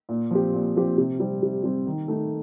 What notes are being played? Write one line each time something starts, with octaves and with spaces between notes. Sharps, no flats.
A#2
F3 C4 G4
A#2
F3 C4 G4
C3
G3 C4
C3
G3 C4
D#3
A3 D#4